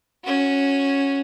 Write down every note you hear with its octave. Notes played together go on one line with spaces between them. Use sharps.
C#4 F#4